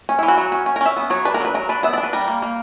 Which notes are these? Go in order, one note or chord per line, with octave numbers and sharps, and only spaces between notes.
C#4
E4
E3
F#4
F#3
C#4
C#4
A#4
C#4 E5
B3
F#3 C#5
D4 B4
A#4
F#3 B4
F#3 A#4
D4 B4
B3 E5
D5
D4
B4
G3 A#4
A#3
A#3